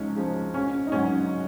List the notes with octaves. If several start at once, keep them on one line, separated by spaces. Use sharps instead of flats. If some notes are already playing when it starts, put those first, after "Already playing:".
Already playing: C#2 F3 C#4 D#4
C#3 F3
A#1 C#4
D#4
G#2 F#3 C#4